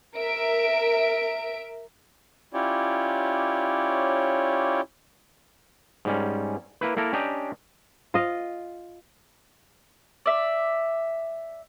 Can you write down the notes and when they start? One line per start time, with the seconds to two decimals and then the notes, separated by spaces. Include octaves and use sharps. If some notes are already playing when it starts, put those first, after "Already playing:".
0.17 A#4 E5 D7
2.54 C#4 E4 F4 G4 C#5 D5
6.05 G#2 G3 C#4
6.81 A#3 E4 B4
6.97 A#3 E4 A4 A#4
7.13 C#4 D4 G4 D#5 G5 A#5
8.14 F4 D#5 F5
10.26 D5 E5